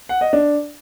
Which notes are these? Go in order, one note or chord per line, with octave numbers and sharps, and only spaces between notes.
F#5
D#5
D4